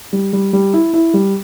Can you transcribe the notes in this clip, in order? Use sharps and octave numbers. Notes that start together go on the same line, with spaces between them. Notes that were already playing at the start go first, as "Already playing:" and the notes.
G3
G3
G3
E4
E4
G3